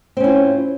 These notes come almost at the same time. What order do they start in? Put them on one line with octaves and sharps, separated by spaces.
C4 C#4 E4 F4